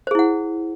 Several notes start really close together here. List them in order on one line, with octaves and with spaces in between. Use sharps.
C5 G#4 E4 F#5